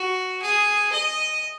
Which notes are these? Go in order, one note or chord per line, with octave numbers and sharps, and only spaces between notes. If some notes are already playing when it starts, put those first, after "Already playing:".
Already playing: F#4
G#4
D#5